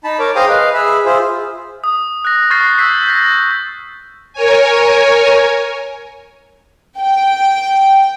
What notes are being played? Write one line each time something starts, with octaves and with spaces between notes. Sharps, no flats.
D#4 A5 B5
A#4 C#5 D6
G#4 C5 F5 G5 A#5 D#6
B4 D#5 F5
G#4 E5 B5
F4 G#4 C5 E5
D#6
F#6 A#6
C#6 F6 G6 A6 A#6 C7
E6 G6 B6 C7
G6 A#6
A#4 C#5 G#5
G5